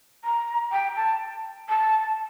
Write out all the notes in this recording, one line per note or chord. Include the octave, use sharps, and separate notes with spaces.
A#5
G5
A5
A5